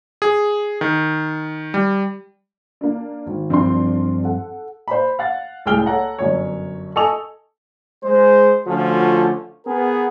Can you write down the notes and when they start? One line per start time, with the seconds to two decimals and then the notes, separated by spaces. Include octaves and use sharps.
0.22 G#4
0.81 D#3
1.74 G3
2.81 A#3 D4
3.26 G#1
3.50 G2 F3 C4 D4 C6
4.23 A4 F#5
4.88 C5 B5
5.19 F5 F#5 A6
5.66 C#2 A2 G#4 G5 F6 G7
5.86 A4 C#5 F#5 A#5
6.19 G1 F#2 C#5
6.96 A4 D#5 G#5 C#6 D#6 F7
8.04 G#3 C5
8.67 D3 F3 A3 C#4 F4 F#4
9.66 B3 G#4 A#4